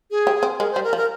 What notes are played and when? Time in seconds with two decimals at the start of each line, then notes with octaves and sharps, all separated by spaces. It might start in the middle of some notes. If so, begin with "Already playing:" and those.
0.11 G#4
0.27 G4
0.43 C4
0.59 G#3 A#4
0.71 C5
0.76 G3
0.84 A#4
0.93 F3
0.97 A#4